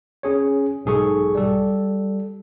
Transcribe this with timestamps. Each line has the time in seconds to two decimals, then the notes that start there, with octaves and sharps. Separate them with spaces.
0.23 C#4 G#4 C#5
0.85 B1 G#2 G#4 A4 C#6
1.35 G3 A4